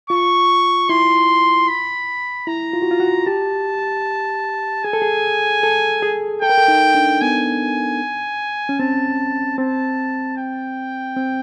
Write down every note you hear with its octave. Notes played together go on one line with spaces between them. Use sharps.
F4 C#6
E4 C6
B5
E4 A#5
F4
F#4
F4
F#4
G4 A5
G#4 G#5
A4
G#4
A4
G#4
A4 G5
A#4
A4
D#4
D4
B3 G#5
C#4
C4 A5
C4 A5
G5
C4